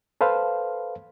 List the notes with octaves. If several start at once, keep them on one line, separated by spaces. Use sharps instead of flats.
A4 B4 C5 F5